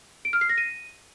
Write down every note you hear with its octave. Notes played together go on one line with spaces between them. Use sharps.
D7
F6
C7
A#6
D#7